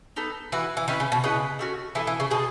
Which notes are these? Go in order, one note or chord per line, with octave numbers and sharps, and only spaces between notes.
B3 D#4 A4
E3 F#4 B4 F#5
E3
D#3 C#4 E4 B4 E5
C#3
B2
C#3 E4 B4 D#5 F#5
A3 C#4 F#4
E3 B3 E4 A4
E3
C#3
B2 G#4 D#5 A5